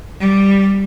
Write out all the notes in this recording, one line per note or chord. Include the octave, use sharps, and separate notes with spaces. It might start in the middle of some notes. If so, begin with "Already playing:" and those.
G3